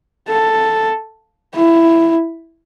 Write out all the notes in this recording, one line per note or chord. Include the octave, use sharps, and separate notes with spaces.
A4
E4